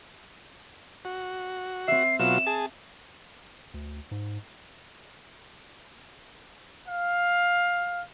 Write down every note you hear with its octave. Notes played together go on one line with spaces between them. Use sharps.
F#4
C4 E5 C7
B2 F#3 F4 E7
G#4 A5
D2
G#2
F5